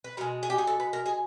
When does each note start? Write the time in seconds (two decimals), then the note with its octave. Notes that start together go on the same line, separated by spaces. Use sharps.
0.04 B4
0.17 B2 A#4
0.21 G#3
0.43 G#4
0.50 G4
0.58 G#4
0.67 A4
0.80 B4
0.93 A#4
1.06 G#4